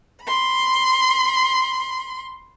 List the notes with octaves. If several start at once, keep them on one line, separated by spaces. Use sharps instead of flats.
B5 C6